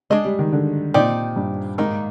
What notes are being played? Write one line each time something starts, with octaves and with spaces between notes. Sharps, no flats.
G#3 D4 G#4 D#5
G3
D#3
D3
A#2 C4 D#4 G4 D5
G2
G#2 D#3 A#3 D#4